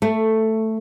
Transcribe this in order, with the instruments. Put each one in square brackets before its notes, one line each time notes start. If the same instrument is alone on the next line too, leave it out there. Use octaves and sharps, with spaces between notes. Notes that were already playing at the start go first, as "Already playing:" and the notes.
[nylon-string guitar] A3